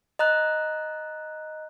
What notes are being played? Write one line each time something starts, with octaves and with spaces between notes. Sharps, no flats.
D#5 A#5 F#6